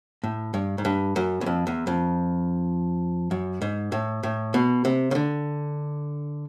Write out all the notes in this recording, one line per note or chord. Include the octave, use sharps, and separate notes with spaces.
A2
G2
G#2
G2
F#2
E2
F2
E2
F2
F#2
G#2
A2
A2
B2
C3
C#3
D3